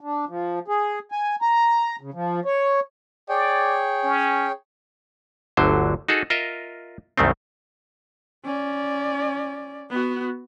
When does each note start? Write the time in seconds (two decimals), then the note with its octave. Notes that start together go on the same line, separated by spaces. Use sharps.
0.01 D4
0.29 F3
0.68 G#4
1.12 G#5
1.42 A#5
2.01 C#3
2.14 F3
2.45 C#5
3.29 G#4 C#5 D5 G5
4.04 C#4
5.57 G1 D2 D3 F#3 C5
6.09 D#4 F#4 G#4 A4
6.30 F4 A#4 D#5 E5
7.18 C2 F#2 D#3 A3 C4
8.45 C#4 D5
9.90 B3 F#4